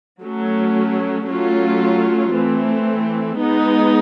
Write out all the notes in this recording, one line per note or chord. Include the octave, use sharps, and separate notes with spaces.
F#3 A3 C#4
F#3 A3 C#4 F4
E3 A3 C4
G#3 B3 D#4